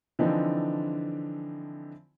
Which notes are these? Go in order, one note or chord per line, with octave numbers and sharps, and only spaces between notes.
D3 E3 F3 C4 D4 D#4